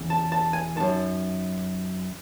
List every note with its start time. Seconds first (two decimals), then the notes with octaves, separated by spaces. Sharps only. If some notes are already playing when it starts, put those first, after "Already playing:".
Already playing: E2 C#3
0.10 A5
0.32 A5
0.53 G#5
0.76 F#2 D#3 A5